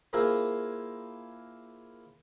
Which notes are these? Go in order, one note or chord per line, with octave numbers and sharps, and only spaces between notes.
A#3 E4 F4 G#4 A#4 C5